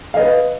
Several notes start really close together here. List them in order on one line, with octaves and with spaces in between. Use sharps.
F5 D#5 B4